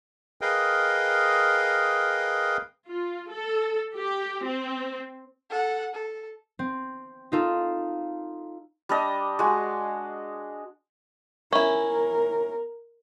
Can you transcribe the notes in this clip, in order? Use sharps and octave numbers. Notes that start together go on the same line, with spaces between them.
G#4 A#4 B4 D#5 F5 G5
F4
A4
G4
C4
A4 F#5
A4
C4
D#4 F4 A4
G3 D4 D#5
G#3 F#4
C#4 E4 A#4